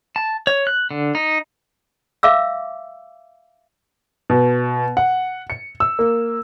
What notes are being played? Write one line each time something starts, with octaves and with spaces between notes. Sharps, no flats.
A5
C#5
F#6
D3
D#4
E5 F5 D6 E6
B2
F#5
C#7
E6
A#3